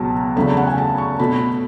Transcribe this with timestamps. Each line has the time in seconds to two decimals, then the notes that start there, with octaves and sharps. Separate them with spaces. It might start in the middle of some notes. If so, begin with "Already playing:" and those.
Already playing: C#2 B2 F#3 A5
0.36 E2 C#3 F#3 A3 B5
0.47 A5
0.57 F#5
0.67 G#5
0.78 A5
0.98 C#6
1.19 B2 A3 B5